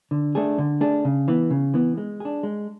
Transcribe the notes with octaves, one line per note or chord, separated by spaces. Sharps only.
D3
A3 D4 G#4
D3
A3 D4 G#4
C#3
E3 B3
C#3
E3 B3
G#3
D4 G#4
G#3